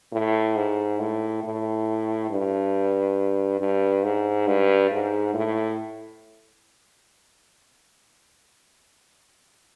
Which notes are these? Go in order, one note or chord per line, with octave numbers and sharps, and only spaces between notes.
A2
G#2
A2
A2
G2
G2
G#2
G2
G#2
A2